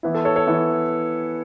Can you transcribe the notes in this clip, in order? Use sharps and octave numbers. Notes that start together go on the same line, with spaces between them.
E3 B3 E4
A4
A4 C#5
A4 C#5
E3 B3 E4